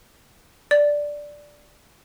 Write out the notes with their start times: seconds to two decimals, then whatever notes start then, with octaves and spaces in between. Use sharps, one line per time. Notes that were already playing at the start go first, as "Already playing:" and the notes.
0.71 D5